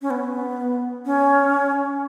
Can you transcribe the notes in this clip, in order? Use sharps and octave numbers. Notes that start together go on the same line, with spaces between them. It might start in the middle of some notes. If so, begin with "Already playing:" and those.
C#4
B3
C#4